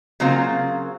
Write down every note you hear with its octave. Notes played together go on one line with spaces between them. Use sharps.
C#3 F#3 A#3 C4 F4